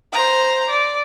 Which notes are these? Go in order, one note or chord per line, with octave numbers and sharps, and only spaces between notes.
C5 A#5
D5